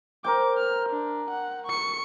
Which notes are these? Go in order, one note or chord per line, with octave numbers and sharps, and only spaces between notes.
A#4 C5 G5 D6
F6
D4
F#5
C#6 C#7